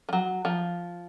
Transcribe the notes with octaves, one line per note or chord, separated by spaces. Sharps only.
F3
F#3
F3